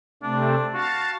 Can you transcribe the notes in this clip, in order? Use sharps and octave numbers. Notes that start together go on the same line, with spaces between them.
C3 A3 C4 D4
F#4 F5 A5